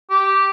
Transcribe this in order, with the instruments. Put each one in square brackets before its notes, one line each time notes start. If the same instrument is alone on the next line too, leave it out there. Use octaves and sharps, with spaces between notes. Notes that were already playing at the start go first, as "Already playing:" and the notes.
[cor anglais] G4